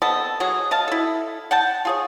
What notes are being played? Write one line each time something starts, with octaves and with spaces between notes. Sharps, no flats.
B3 C4 A4 D#5
F#3 F#4 G#4
D#5 F5 A5
E4 A4
F#5 G5 A5
F4 G#4 C#5